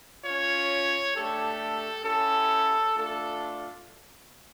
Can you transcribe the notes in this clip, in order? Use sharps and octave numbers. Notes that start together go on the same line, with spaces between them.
C#4 F4 C#5
A3 D4 G4 A4
C#4 E4 G4 A4
A3 D4 F4 A4